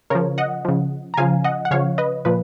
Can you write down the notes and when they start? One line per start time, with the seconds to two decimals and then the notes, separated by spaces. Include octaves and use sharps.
0.10 C#3 F3 A#4 C#5
0.38 D#5 F#5
0.65 C#3 F3
1.14 A#5
1.17 C#3 F3 F5 G#5
1.44 D#5 F#5
1.65 F#5
1.71 C#3 F3 C#5 F5
1.98 B4 D#5
2.25 A#2 F3 B4